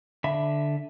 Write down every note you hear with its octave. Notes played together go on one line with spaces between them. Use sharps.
D3 E5 B5